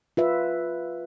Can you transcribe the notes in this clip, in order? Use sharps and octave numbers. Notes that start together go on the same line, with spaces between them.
F4 B4 E5